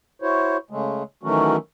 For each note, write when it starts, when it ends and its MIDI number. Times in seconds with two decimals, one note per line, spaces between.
0.22 0.57 64
0.22 0.57 66
0.22 0.57 72
0.22 0.57 73
0.70 1.03 49
0.70 1.03 56
0.70 1.03 57
1.23 1.57 51
1.23 1.57 52
1.23 1.57 54
1.23 1.57 57
1.23 1.57 61
1.23 1.57 66